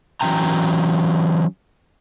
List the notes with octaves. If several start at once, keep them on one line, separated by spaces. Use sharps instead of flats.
E3 F#3 C#4 G5 A#5